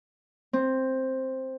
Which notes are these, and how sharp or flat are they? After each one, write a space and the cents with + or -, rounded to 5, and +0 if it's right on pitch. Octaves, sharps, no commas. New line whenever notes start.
C4 +5